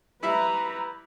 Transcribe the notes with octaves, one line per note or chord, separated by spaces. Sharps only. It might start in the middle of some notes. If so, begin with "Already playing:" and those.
G3 E4 B4 E5 A#5